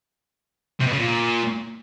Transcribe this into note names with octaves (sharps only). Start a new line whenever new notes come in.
C3
B2
C#3
A#2